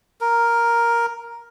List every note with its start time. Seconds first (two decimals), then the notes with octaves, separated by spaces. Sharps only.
0.21 A#4